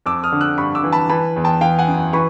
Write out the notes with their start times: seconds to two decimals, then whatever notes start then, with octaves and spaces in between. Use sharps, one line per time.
0.06 F2 D6 E6
0.24 D#6 F6
0.32 D3
0.41 E6 F#6
0.57 G2 B5 C#6
0.75 D6 E6
0.84 E3
0.93 A5 B5
1.09 E3 A5 B5
1.36 E2
1.44 G5 A5
1.61 E3 F5 G5
1.79 F#5 G#5
1.88 F#2
2.13 E3 B5 C#6